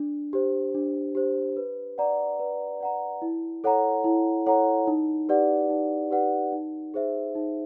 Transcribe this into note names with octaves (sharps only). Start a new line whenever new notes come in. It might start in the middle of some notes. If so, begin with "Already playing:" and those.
Already playing: D4
G4 C5
D4
G4 C5
B4
D5 F#5 A#5
B4
D5 F#5 A#5
E4
A4 C#5 F#5 A#5
E4
A4 C#5 F#5 A#5
D#4
G4 B4 D5 F#5
D#4
G4 B4 D5 F#5
D#4
G#4 C5 E5
D#4